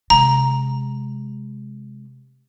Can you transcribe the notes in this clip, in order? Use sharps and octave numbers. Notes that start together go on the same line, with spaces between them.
C3 G#3 A#5